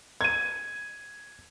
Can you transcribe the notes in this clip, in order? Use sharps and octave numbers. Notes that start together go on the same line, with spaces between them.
G#6 D#7